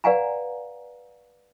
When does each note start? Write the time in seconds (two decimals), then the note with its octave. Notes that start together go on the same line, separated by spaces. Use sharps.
0.04 B4 D5 F5 F#5 G#5 A#5